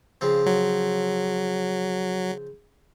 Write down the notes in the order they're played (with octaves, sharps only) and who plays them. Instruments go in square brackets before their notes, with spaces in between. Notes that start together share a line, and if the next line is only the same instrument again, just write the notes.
[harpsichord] C#3 F3 C4
[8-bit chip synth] F#3